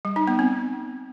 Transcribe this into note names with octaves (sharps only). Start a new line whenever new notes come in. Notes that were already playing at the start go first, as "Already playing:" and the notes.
G3
D#4
B3
C4